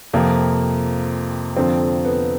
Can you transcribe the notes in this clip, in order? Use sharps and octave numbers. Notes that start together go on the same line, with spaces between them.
F2 C3 F3 A#3
F2 D3 F3 C4
B3